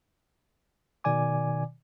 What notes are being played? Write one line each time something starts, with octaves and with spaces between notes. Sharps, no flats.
B2 D#3 D5 G#5 D6